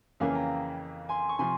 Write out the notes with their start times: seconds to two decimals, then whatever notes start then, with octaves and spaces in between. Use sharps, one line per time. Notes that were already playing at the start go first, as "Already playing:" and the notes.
0.20 F2 C#3 E3 A#3 C#4 F5 G#5
0.35 G5 A#5
1.09 G#5 C6
1.29 C#6
1.39 C3 F3 G#5 C6